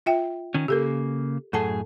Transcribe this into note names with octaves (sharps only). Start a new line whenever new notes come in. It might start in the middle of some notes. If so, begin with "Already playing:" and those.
F4 E5 G5
D#3 C#4
C#3 A#3 G4 A4 A#4
F#2 A2 G#4 A4 F#5 A5